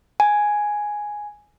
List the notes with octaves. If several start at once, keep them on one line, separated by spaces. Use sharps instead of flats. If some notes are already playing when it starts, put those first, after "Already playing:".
G#5